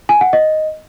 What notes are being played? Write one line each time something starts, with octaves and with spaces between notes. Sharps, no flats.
G#5
F#5
D#5